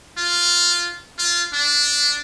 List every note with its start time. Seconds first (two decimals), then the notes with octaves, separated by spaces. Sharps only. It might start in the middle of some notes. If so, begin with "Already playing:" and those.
0.17 F4
1.19 F4
1.53 D4